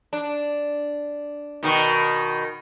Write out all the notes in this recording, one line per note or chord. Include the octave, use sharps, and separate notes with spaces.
D4
B2 D#3